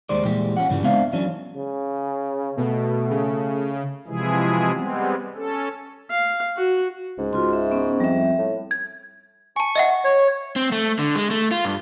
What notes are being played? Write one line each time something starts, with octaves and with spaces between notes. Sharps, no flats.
D#2 D#3 G3 G#3 C5 D5
A#2 E3 G3 G#3 G4
C#4 F4 F#5
G2 C#3 E3 G3
G#3 B3 C4 D4 E5 F5
E3 F#3 C#4 D4
C#3
B2 A3
C#3
C3 E3 F3 G#3 E4 G#4
G3 G#3 B3 C4
C#4 A4
F5
F#4
C#2 G#2
C#2 F4 F#4 C6
E5
B3 C#4
F2 G3 E5
A2
G#6
G#5 A5 C#6
D#5 E5 F#5
C#5
C4
A3
D3
G#3
A3
F4
G2